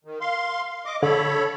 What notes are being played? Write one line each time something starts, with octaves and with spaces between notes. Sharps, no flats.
D#3
F5 C6
D#5 D6
D3 A4 C#5 B5